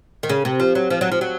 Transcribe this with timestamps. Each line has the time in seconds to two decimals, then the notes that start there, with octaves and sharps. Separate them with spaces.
0.23 D#3
0.29 C#3
0.45 C3
0.60 F3
0.75 F#3
0.90 F3
1.01 F#3
1.12 F3
1.21 F#3